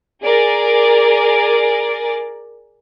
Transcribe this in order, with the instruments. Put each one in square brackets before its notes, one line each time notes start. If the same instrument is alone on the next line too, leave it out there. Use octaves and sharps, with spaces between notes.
[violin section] G#4 A#4 D5